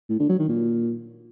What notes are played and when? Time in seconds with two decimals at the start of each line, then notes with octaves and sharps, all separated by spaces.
0.09 A2
0.19 D3
0.29 F#3
0.39 D#3
0.49 A#2